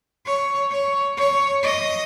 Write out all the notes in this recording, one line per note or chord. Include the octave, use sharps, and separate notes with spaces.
C#5
C#5
C#5
D#5